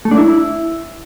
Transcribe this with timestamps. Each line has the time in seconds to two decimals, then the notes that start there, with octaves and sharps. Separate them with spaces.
0.05 A3
0.11 D4
0.18 E4